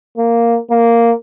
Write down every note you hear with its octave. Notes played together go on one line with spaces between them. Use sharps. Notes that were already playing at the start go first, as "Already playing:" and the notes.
A#3
A#3